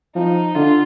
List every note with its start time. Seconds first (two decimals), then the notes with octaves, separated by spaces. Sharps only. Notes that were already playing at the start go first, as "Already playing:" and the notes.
0.16 F3 D#4
0.55 D3 F4